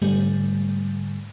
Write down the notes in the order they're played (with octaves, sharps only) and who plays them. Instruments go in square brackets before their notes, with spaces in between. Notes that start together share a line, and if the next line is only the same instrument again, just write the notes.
[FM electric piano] G#2 D3 G3 A3